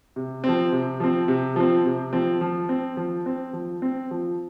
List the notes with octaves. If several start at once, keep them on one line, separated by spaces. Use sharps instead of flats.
C3
F3 C4
C3
F3 C4
C3
F3 C4
C3
F3 C4
F3
C4
F3
C4
F3
C4
F3